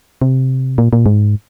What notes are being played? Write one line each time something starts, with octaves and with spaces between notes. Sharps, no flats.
C3
A#2
A#2
G#2